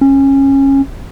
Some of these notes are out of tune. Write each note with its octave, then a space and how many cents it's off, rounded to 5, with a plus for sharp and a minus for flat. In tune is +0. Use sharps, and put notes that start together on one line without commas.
C#4 -20